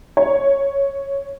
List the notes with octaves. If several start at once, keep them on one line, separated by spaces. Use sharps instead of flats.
C#5